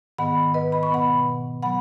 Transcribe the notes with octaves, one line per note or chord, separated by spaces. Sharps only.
G#2 D#3 B3 F#5 B5
B4 D#5
B5
C#6
B2 B3 F#5 B5
F#3 B3 F#5 B5